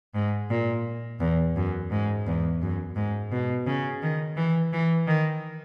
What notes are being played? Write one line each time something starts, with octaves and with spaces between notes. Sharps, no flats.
G#2
A#2
E2
F#2
G#2
E2
F#2
G#2
B2
C#3
D#3
E3
E3
D#3